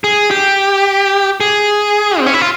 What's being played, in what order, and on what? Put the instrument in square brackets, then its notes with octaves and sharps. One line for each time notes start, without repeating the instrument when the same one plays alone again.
[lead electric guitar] G#4
G4
G#4
C4
C#4
E4
F4